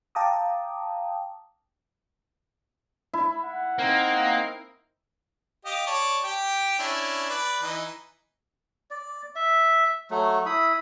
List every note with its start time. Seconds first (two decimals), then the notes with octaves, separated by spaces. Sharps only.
0.15 F5 G5 A5 A#5 D6 D#6
3.13 E4
3.44 F#5
3.79 A#3 C4 D#4 A#4
5.65 G4 D#5 F5
5.87 C#5 D5 A5
6.23 G4 G5
6.79 C#4 D4 E4
7.29 B4 D5
7.62 E3 D#4
8.91 D5
9.36 E5
10.10 F#3 A3
10.46 E4 B5 D#6